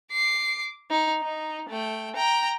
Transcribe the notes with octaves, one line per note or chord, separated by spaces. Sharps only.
D6 C7
D#4
D#4
A3 G5
G5 A#5